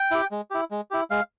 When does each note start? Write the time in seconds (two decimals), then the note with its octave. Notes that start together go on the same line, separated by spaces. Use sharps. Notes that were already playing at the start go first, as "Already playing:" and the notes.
Already playing: G5
0.11 E4 G4
0.31 G#3
0.51 E4 G4
0.71 G#3
0.91 E4 G4
1.11 G#3 F5